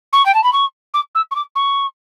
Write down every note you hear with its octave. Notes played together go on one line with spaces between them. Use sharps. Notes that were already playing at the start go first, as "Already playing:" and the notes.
C#6
G5
A5
B5
C#6
D6
E6
C#6
D6
C#6